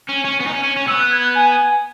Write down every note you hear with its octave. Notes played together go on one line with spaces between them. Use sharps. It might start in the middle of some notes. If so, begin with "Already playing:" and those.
C#4
C#4
B3
D#4
C#4
C#4
C#4
B3 E6
F#6
G#6
F#6
G#5